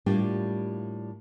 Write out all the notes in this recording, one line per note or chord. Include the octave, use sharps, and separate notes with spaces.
A2 G3 A#3 D4 F4 G4